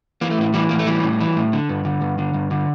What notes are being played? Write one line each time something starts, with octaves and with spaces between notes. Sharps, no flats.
E3 A#3
A3
A2 A#3
E3 G3
A2 A#3
A3
E3 G3
A2
E3
A2
D3
G2
D3
G2
D3
G2
D3